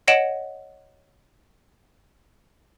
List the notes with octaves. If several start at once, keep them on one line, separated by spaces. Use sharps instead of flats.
C#5 D#5 F#5 D7 E7 F#7